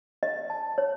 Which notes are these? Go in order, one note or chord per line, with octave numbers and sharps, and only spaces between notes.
D#5
A5
C#5